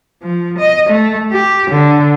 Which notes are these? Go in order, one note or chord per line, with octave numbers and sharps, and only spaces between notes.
F3
D#5
A3
G4
D3